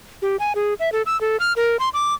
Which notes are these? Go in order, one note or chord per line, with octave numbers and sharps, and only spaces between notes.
G4
G#5
G#4
E5
A4
E6
A4
F6
A#4
C6
D6